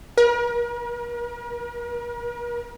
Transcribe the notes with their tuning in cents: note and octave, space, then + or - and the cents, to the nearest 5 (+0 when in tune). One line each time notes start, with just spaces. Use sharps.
A#4 +45